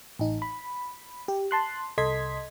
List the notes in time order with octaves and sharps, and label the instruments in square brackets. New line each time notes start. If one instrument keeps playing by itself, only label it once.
[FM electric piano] A1 D#4
B5
G4
A5 C6 F#6
C2 A4 D#5 C6 G#6 B6